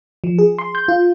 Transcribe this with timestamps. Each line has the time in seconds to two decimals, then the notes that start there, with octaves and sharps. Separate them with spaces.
0.24 F3
0.39 G#4
0.59 C6
0.75 G6
0.88 F4